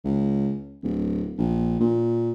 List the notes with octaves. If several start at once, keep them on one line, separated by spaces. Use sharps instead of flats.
C#2
D1
A#1
A#2